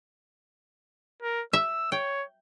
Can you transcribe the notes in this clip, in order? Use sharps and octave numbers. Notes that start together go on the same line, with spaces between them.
A#4
E5 E6
C#5 G5